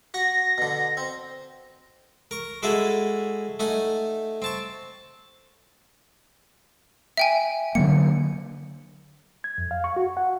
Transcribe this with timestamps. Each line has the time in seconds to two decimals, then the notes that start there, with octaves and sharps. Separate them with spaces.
0.14 F#4 A#6
0.58 B2 D3
0.97 C4
2.31 A#4 C#6
2.63 G#3 E4 F#4 G#4 A4
3.60 A3 D#4 F#5 G#5
4.42 C4 A5 C#6
7.17 E5 G5 G#5
7.75 D3 F#3 A#3 C#7
9.44 G#6
9.58 F2
9.71 F5
9.84 C#6
9.96 F#4
10.17 F#5